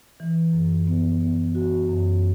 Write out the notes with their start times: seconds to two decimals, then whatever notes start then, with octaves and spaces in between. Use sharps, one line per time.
0.20 E3
0.53 F#2
0.87 B3
1.21 B3
1.55 F#4
1.89 F#2